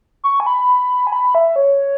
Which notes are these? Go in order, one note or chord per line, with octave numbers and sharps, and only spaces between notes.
C#6
G#5
B5
G#5
B5
E5
C#5